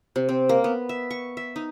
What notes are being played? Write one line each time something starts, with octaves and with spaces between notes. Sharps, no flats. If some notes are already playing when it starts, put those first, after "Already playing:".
C3
C4
A#3
B3
E5
C#6
E5
D#4